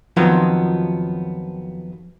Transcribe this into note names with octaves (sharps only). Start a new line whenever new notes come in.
F2 D#3 F3 F#3 B3 F4